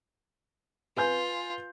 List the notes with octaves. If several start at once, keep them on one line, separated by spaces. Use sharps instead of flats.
F4 B4 G#5 G6